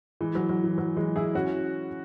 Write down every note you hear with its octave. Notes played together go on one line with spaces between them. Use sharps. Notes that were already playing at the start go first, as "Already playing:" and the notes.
E3 G#3
F#3
F#3
E3
F#3
E3 G#3
E4 G#4
C#4 F#4